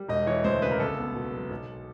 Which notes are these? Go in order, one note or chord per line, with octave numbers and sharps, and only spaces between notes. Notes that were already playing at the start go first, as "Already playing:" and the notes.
Already playing: G3
E1 D#5
E3 C#5
D2 C5
C#3 B4
A#4
C2 A4
B3
B2
F#3
B1